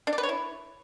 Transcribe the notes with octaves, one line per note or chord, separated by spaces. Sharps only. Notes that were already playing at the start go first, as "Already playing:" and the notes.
D4
D5
B4
C#5
E4